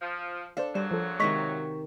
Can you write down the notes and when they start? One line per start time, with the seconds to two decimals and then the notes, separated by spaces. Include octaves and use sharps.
0.02 F3
0.57 D4 A4 C5 D5 F5
0.75 A#2 C#3 F#3 G3 C5
0.91 F3 A4
1.20 C3 D#3 G#3 A#5 C#6 B6